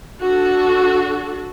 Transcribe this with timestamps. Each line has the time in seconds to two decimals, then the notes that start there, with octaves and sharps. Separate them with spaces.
0.20 D4 F#4 A4